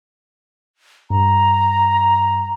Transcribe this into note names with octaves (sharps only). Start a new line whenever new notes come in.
G2 A#5